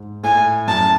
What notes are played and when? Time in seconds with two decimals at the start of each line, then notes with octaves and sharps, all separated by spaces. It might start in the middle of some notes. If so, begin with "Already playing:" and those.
Already playing: G#2
0.23 A2 G#5
0.68 F#2 A5